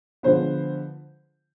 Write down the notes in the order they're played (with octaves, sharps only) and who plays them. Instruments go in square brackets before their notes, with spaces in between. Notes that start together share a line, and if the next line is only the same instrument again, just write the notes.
[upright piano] D3 F3 G#3 B3 C5